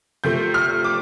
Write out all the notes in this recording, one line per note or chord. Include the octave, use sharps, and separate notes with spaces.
C3 F3 A3 G6
F6
D6